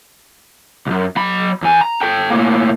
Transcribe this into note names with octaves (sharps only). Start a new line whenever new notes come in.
C2 F#2
F#3 B5
E2 G#5
A#5
A4 G5
A2 A#3